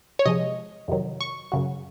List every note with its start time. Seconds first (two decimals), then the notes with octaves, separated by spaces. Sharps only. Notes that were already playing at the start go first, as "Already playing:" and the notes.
0.19 C#5
0.26 C3 F3 G#3 D#5
0.88 F2 C3 D#3 F#3
1.21 C#6
1.52 F#2 C#3 F#3